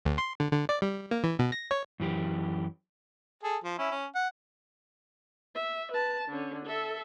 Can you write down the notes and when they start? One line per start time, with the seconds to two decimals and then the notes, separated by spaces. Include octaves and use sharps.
0.05 D2
0.18 C6
0.40 D3
0.53 D3
0.69 D5
0.82 G3
1.11 A#3
1.24 E3
1.39 B2
1.52 A#6
1.71 C#5
2.00 F#2 E3 G4
3.44 G#4 A4
3.64 F3
3.79 C#4 E4
3.91 C#4
4.15 F#5
5.55 E5
5.92 B4 A5
6.28 D3 C#4
6.66 A4 E5